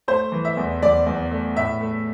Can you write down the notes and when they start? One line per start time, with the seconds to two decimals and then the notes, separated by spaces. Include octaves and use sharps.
0.08 A3 C5
0.32 E3
0.45 E5
0.57 E2
0.83 E2 D5
1.06 E2
1.31 A3
1.56 A2 E5
1.81 A3